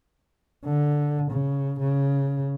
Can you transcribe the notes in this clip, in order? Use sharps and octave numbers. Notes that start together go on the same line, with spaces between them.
D3
C#3
C#3